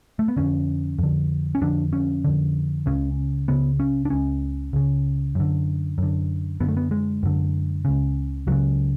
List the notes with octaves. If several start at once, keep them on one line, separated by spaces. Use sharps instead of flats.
A3
B3
F2 D3 C#4
F2 D3
C#4
F2 D3 D4
C#4
F2 D3
C#2 C#3 C#4
C#2 C#3 B3
C#4
D4
C#2 C#3 C#4
C#2 C#3
F#2 D3
F#2 D3
F#2 D3 B3
A3
B3
G#3
F#2 D3
C#2 C#3
C#2 C#3 F#3